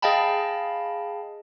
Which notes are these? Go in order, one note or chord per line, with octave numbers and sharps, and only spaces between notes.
G#4 D#5 F5 G5 A5 B5